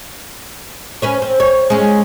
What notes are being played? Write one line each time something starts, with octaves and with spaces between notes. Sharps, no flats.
C#4 B4 C#5
C4
C#5
G#3 C#4